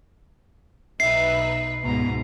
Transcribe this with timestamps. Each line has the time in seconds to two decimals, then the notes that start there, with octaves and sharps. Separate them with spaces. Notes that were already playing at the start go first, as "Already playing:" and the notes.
1.00 B1 D#4 B4 E5 C7
1.85 C#2 G#2 B2 A#5